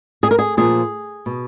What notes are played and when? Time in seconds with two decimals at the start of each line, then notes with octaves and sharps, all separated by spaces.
0.23 G#4
0.31 A#4
0.39 G#4
0.57 A#2 F3 G#4
1.26 B2